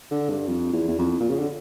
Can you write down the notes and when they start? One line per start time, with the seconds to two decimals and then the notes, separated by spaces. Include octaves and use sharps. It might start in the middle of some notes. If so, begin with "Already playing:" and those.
0.11 D3
0.30 G2
0.48 F2
0.73 E2
0.88 E2
0.99 F2
1.20 A#2
1.29 C#3
1.39 D3